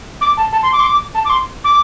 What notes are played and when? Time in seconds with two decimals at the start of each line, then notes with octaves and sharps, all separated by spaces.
0.21 D6
0.37 A5
0.53 A5
0.63 C6
0.73 D6
0.79 C6
0.84 D6
1.15 A5
1.25 D6
1.30 C6
1.64 D6